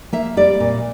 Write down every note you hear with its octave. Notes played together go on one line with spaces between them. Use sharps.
A#3 E5
G3 D5
A#2